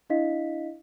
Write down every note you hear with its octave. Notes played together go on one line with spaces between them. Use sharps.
D4 E4 D#5 F5 B6